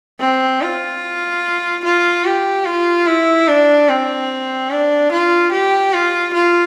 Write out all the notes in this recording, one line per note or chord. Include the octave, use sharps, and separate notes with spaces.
C4
F4
F4
G4
F4
E4
D4
C4
D4
F4
G4
F4
F4